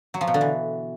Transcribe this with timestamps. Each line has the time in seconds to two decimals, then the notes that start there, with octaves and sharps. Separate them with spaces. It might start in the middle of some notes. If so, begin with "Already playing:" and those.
0.14 F#3
0.21 F3
0.27 B2
0.34 D3
0.41 E3